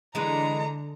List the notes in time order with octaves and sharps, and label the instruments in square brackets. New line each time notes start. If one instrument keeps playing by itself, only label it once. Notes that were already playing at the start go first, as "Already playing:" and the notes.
[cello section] D3 [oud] E3 G#3 B4 [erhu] A#5